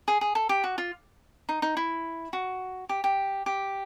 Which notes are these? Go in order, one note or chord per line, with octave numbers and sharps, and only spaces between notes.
G#4
G#4
A4
G4
F#4
F4
D#4
D#4
E4
F#4
G4
G4
G4